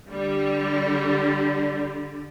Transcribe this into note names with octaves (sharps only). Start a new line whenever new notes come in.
D3 G3